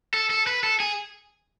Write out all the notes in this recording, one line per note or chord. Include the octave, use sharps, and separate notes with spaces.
A4
A4
B4
A4
G#4